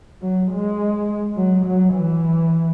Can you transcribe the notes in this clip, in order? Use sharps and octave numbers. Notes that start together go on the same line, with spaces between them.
F#3
G#3
F#3
F#3
E3